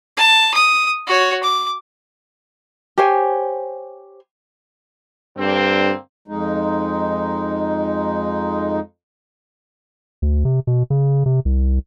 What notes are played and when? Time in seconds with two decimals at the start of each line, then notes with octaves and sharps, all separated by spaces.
0.17 A5
0.54 D#6
1.07 F#4 C#5
1.43 D6
2.98 G4 C5 C#5 G#5
5.37 G2 D3 A#3 C4
6.28 F2 G#3 D#4
10.22 D2
10.45 C3
10.67 B2
10.90 C#3
11.26 C3
11.45 C2